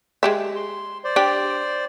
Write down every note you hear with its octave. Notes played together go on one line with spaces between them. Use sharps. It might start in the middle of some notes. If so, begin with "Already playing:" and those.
G#3 G4 E5
C6
C5 D5
D4 G4